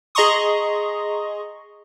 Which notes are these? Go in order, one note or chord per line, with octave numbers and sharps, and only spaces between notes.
G#4 D#5 A#5 C6 C#6 D#6